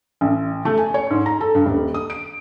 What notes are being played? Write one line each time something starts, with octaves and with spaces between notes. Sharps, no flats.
A1
A3
G#5
C#5
G#2
A#5
A4
G2
D#1
D#6
D7